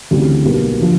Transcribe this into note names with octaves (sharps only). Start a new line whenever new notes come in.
D2 C#3 E3 G3 C4
B1 B2 G3 A#3
D3 F3